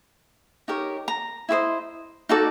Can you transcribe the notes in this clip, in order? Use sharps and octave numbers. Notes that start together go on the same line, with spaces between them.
D#4 G4 A#4 C#5
A#5
E4 G4 C5 D#5
D#4 F#4 A4 D5